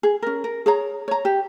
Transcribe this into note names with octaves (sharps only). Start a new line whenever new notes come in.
G#4
C#4 A#4
A#4
G#4 C#5 A#5
C#5 A#5
G4